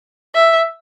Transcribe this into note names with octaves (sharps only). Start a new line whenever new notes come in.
E5